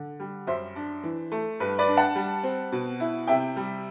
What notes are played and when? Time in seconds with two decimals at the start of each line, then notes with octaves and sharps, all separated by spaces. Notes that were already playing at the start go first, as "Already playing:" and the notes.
Already playing: D3
0.20 G3
0.47 F#2 C5 E5
0.76 D4
1.03 E3
1.32 A3
1.60 G2 B4
1.79 B4 D5
1.88 D4
1.97 F#5 A5
2.15 G3
2.43 C4
2.72 B2
3.00 E4
3.28 C3 E5 G5
3.56 G3